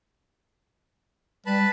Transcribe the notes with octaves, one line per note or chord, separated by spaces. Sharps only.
G3 B4 A5 B5